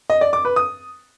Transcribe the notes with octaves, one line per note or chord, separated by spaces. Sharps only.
D#5
D5
D6
B4
D#6